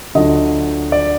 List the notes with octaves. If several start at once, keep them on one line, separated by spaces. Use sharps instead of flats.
D2 D3 F#3 D4 F4 D#5
D5